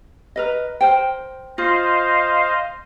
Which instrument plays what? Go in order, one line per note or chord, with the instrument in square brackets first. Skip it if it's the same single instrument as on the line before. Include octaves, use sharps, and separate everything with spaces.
[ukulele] A#4 B4 D#5
A#4 C5 G5
[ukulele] F4 [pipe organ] C5 D#5 F5